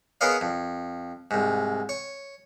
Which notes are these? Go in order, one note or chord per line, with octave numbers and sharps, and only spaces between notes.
B3 G#4 A#4 C#5 D#5 F5
F2
C2 G#2
C#5